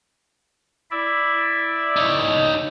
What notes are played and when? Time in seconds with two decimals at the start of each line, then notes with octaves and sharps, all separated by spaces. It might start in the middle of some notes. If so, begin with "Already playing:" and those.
0.91 E4 D5 E5
1.96 D#4 C#5